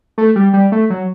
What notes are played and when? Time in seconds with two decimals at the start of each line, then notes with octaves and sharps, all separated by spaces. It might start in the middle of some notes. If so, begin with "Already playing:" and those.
0.18 A3
0.36 G3
0.53 G3
0.72 A3
0.90 F#3